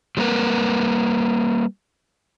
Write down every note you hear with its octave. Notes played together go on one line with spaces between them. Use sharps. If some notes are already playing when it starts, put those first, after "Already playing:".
F#3 G3 A3 A#3 A#4 B4